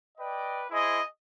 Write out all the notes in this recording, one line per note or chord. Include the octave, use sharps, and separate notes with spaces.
B4 D5 D#5 G5
E4 G#4 C5 D#5